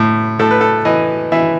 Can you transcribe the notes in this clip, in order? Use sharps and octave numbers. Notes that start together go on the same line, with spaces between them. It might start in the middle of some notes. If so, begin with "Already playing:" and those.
Already playing: A2
A2 A4
B4
A4
E3 D#5
E3 E5